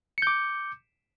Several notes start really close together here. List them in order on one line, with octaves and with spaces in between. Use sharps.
C#7 G6 D6